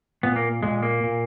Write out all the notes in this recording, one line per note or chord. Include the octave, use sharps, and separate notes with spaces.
A#2 B3
A#3
A#2 G#3
A#3
A#2